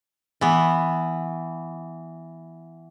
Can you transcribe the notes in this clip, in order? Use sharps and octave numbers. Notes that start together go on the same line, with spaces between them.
E3 B3